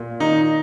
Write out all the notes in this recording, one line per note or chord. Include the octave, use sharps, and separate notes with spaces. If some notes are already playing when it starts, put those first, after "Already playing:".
Already playing: A#2
D#3 D#4